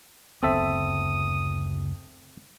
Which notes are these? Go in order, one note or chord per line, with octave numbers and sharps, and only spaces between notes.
F#1 D2 B3 C4 A4 E5 D#6